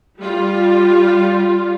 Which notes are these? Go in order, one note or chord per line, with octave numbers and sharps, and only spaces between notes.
G3 F4